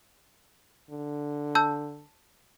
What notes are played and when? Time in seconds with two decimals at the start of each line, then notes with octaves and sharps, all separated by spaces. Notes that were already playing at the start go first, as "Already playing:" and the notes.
0.91 D3
1.55 A5 E6 G6